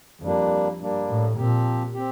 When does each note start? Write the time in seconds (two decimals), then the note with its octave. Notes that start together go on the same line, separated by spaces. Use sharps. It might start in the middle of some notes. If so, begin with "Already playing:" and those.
0.22 F2 G3 A#3 D4
0.80 G2 G3 A#3 D4
1.09 A2
1.37 A#2 F3 C4 G4
1.94 C4 G4